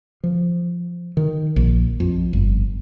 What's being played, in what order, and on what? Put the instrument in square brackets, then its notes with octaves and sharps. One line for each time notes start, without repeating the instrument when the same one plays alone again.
[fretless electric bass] F3
D#3
A#1
F2
G1